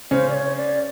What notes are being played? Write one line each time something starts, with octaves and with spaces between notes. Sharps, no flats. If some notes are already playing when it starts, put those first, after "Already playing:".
C#3 C#4 C5
D5
C#5
D5